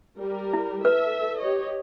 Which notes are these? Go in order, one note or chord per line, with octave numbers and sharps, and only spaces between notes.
G3 A#4
E4
A4 B4 E5
G4 C#5 D#5